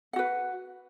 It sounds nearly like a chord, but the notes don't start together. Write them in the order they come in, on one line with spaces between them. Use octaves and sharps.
F#5 F#4 B4